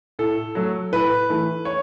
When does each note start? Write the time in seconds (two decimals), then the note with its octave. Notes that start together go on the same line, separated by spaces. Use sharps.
0.19 A2 A4
0.55 F#3 A3
0.92 A2 B4
1.29 E3 A3
1.65 C#5